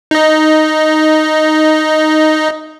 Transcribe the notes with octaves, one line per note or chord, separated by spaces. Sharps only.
D#4 D#5